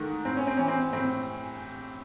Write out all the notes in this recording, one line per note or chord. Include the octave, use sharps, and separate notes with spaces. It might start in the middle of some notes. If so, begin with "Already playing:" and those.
Already playing: G#2 D#3 A3
A2 C4
C#4
C4
E3 C#4
C4
A2 C4